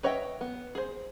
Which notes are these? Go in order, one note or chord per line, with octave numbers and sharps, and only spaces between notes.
B4 C#5 D#5 E5 G5
B3
G#4 C5